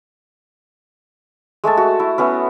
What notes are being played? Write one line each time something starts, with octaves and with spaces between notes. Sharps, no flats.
G#3 A3 E5 A5
F#4
E4
B3 C#4 E4